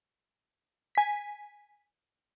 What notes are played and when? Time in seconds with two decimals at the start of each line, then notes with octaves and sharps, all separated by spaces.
0.95 G#5 B6